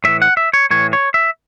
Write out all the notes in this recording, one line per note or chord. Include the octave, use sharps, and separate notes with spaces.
A2 E3 E5
F#5
E5
C#5
A2 E3 C#5
C#5
E5